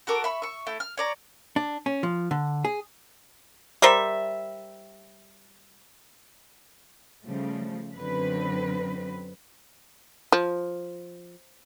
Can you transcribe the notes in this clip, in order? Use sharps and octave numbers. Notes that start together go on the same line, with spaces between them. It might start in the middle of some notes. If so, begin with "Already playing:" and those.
F#4 A4 A#4 D6
E5 B5 C#6
E5 C#6
A3 E4
F6
C#5 D5 A#5
D4
C#4
F3
D3
G#4
G3 A#4 C5 E5
C#3 F3 G3 A3
F#2 D3 C4 B4
F3